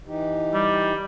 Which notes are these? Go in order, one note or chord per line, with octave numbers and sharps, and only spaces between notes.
E3 D#4 G4
G3